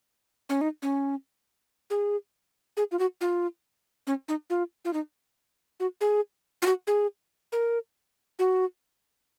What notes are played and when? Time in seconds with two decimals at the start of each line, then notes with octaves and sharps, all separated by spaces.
0.49 C#4
0.61 D#4
0.82 C#4
1.90 G#4
2.77 G#4
2.92 F4
2.99 F#4
3.21 F4
4.07 C#4
4.28 D#4
4.50 F4
4.85 F4
4.93 D#4
5.80 F#4
6.01 G#4
6.62 F4
6.66 F#4
6.87 G#4
7.52 A#4
8.39 F#4